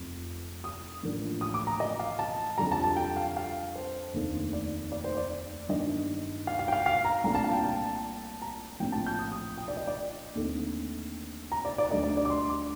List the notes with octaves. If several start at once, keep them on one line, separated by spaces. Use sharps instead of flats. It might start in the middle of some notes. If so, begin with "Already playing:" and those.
Already playing: F1 F2 C3
D#6
A1 A2 F3 A#3 D4
D#6
D6
A#5
D#5
F5
A5
F2 D3 G3 A#5
A5
A5
G5
F5
F5
C5
F1 D#2 D#3 A3 D4
D5
D5
C5
D5
G1 G2 D#3 A#3 D4 D#5
F5
F5
G5
F5
F5
A#5
C2 A#2 A3 D4 A#5
A5
F5
G5
A5
A#5
A#1 A2 F3 C4 G5
A5
G6
D#6
D#6
G5
D5
D#5
D5
D#2 D3 A3 C4
A#5
D5
D5
D2 D3 G3 D4 D#5
D5
D5
D6
C6
D6